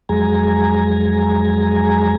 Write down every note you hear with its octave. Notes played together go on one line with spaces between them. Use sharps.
F2 F#3 G#3 G#4 G#5 A#5